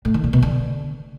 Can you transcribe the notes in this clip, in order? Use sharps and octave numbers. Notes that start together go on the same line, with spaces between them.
A2
D#3
A#2
B2
D3